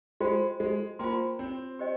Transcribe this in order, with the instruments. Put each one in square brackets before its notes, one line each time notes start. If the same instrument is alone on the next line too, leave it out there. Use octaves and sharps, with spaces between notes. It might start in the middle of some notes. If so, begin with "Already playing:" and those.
[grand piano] G#3 [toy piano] F4 C5 G5 C6
[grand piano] G#3
[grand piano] A#3 [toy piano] F4 C5 G5 C6
[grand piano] C4
[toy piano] G4 C5 D#5 G5